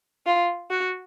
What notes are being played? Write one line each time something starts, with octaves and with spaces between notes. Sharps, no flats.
F4
F#4